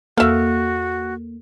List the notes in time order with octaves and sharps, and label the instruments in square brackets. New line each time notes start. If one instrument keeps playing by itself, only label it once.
[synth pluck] E2 A4 [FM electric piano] A#3 [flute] F#4 [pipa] E5 F5